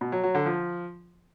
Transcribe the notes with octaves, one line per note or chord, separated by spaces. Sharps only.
B2
F#3
F#3
D3
F3